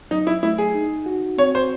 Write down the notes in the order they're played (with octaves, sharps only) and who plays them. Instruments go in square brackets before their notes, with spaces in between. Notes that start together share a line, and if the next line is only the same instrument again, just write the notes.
[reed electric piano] F#3 [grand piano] D#4
[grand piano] E4
[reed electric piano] A3 [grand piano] E4
[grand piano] G#4
[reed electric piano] D#4
F#4
[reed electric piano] C4 [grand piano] C#5
[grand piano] C5